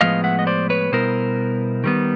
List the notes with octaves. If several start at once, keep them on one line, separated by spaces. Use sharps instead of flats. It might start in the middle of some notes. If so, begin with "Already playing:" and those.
A2 F3 G#3 B3 D#5 F5
E5 F#5
D#5
C5 D5
B4 C#5
B2 G3 B3 E4 A#4 C5
D#3 G3 B3